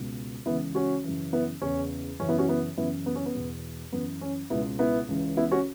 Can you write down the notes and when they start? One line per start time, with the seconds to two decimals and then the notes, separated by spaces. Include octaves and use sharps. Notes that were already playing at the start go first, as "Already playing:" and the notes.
Already playing: C#2 B2
0.46 C#2 C#3 E3 B3 E4
0.75 C#4 F#4
1.04 F#2 C#3 E3
1.33 B3 E4
1.62 E2 C#3 E3 C#4
2.20 F#2 C#3 E3 C#4
2.29 B3 E4
2.38 C#4 F#4
2.49 B3 E4
2.77 F#2 C#3 E3 B3 E4
3.06 B3
3.15 C#4
3.26 B3
3.35 E2 B2
3.92 F#2 E3 B3
4.21 C#4
4.50 C#2 B2 B3 E4
4.79 B3 E4
5.08 C#2 C#3 E3
5.37 B3 E4
5.51 C#4 F#4